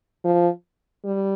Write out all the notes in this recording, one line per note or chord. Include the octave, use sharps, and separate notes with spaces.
F3
G3